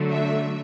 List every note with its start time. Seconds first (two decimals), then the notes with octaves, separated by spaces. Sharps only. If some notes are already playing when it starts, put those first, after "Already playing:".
Already playing: D3 F#3 A3
0.10 E5